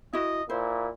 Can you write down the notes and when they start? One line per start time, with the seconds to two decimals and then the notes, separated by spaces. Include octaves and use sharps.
0.13 E4 F#4 D#5
0.50 A#2 E4 C5